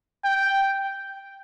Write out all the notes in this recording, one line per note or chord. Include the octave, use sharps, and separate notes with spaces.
G5